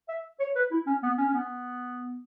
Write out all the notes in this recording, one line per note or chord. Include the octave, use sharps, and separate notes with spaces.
E5
C#5
B4
E4
C#4
B3
C#4
C#4
B3